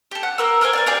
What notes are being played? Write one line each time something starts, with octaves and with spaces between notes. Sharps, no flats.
G4 A4
F#5
A#3 A#4 E6
A4 A#4 C5 G#5
D5 F5 G#5
G4 G#4 D5 F5